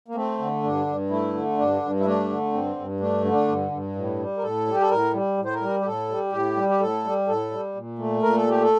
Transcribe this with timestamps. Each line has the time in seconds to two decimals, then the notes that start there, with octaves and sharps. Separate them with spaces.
0.08 A#3
0.15 A3 C4
0.39 D3
0.63 G2 D4
0.87 G2
1.10 A3 E4
1.34 D3
1.58 G2 D4
1.82 G2
2.00 E4
2.05 A3 D4
2.30 D3
2.53 G2 C4
2.76 G2
3.00 A3 D4
3.25 D3
3.31 D4
3.48 G2
3.71 G2
3.96 A2
4.19 G3
4.38 A#4
4.43 A2 A4
4.67 G3
4.74 G4
4.82 A4
4.90 A2 A#4
5.13 G3
5.38 A2
5.45 C5
5.53 A#4
5.61 G3
5.81 G4
5.85 A2 A4
6.09 G3
6.32 A2 G4
6.56 G3
6.69 G4
6.80 A2 A4
7.04 G3
7.27 A2 A4
7.51 G3
7.75 A#2
7.99 A3
8.22 A#2 A#4
8.36 A4
8.47 A3 G4
8.62 A4